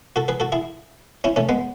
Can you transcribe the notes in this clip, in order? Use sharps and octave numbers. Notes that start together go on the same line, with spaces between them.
F#4 A4
G#4 B4
F#4 A4
E4 G#4
C#4 E4
A3 C#4
G#3 B3